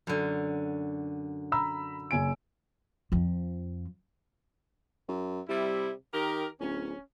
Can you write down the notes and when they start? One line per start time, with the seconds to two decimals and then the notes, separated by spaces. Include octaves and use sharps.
0.07 F#2 D3
1.52 A#5 B5 E6
2.11 F#1 G#5 D7
3.12 F2 F3
5.08 F#2
5.49 C3 G3 E4
6.14 D#3 G4 A#4
6.60 D1 C#4